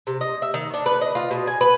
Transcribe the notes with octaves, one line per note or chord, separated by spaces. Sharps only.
C3
D#5
E5
D#3
D4
B4
D#5
F4
B2
G#5
B4